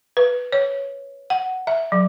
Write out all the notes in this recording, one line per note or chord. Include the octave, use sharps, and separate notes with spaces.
B4
C#5
F#5
E5
F#3